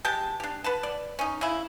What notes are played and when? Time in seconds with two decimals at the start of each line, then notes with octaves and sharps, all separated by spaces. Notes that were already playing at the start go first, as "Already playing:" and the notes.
0.05 G#3 G4 G5 A5
0.40 D4 G4
0.64 B4 F#5 A5
0.83 D5
1.19 C#4 D#4
1.41 C#3 E4